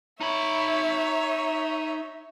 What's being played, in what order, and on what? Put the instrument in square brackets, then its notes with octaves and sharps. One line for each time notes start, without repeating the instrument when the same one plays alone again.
[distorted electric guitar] D#4 B5 [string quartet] C#5 E5